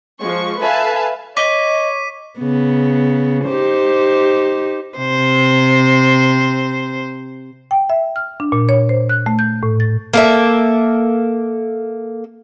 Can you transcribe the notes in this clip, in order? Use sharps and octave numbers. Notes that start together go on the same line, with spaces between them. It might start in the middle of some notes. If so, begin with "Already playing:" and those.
F3 G#3 C#6
A4 B4 E5 F5 G#5 A5
C#5 D#5 D6 B6 D#7
C#3 B3
D#4 G4 C5
C3 C5
G5
E5
F6
D4
A#2
C#5
C5
F#6
A3
G6
A2
A6
A#3 A4 E5